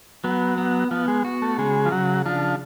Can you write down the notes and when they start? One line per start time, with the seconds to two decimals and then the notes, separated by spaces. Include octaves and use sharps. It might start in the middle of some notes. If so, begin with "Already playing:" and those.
0.24 F#3 B3
0.58 B3
0.91 F3 B3
1.08 G#3
1.25 F#4
1.42 A3
1.58 C#3 G#3
1.85 F3
1.92 C#3 F#3
2.26 F3 D4